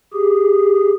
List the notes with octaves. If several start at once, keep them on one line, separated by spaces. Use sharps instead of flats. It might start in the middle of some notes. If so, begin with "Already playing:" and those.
G4 G#4